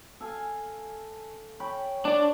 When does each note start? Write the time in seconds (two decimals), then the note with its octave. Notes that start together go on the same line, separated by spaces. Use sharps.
0.20 A4 F5 G#5
1.60 C#5 G5 B5
2.05 D4 D5